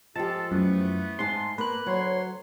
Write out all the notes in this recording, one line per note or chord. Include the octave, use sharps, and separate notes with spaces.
F3 G#3 F4 G4 A4 A5
F#2 E3 A3 B3
G#2 D#4 A5 C6
A#3 B4 F#6
D2 F#3 C#5 C6